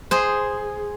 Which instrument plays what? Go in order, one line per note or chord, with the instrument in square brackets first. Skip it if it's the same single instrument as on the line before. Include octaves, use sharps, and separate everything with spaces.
[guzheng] G#4 C5